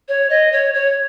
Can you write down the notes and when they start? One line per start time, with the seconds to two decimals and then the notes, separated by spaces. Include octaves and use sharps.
0.08 C#5
0.30 D#5
0.52 C#5
0.74 C#5